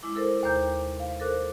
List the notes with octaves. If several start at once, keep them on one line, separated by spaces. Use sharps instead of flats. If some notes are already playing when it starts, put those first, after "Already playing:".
G#3 E4 D6
E4 A4 A#4 C5
D#2 C3 C5 A#5 D6 G6
F5
A4 A#4 C5 D6 F#6